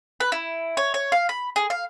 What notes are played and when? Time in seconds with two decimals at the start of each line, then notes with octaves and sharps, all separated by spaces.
0.20 B4
0.32 E4
0.77 C#5
0.94 C#5
1.12 F5
1.29 B5
1.56 G#4
1.70 F5